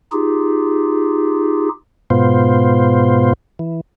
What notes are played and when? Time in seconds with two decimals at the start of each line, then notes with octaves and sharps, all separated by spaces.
0.12 D#4 F4 G4 G#4
2.10 G#2 B2 B3 F4 C5
3.59 E3